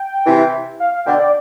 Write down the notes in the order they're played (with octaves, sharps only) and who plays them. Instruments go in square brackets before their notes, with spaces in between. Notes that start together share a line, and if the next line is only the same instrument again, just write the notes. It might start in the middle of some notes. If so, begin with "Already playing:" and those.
Already playing: [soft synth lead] G5
[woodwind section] C3 E3
[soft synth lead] F5
F5
[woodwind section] B2 D3 [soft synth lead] G5
[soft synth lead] D5